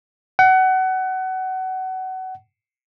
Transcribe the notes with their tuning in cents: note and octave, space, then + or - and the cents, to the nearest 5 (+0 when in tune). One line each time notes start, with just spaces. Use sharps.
F#5 +25